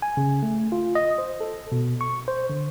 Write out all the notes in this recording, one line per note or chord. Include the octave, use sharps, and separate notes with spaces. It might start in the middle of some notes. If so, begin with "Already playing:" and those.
G#5
C#3
A3
F4
D#5
C5
A4
B2
C#6
C5
D3